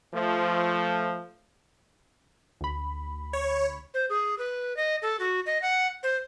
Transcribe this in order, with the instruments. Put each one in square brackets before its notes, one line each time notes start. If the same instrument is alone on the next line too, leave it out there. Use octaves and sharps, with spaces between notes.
[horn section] F3 A3
[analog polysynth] D2 B5
[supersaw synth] C#5
[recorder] C5
G#4
B4
D#5
A4
F#4
D#5
F#5
C5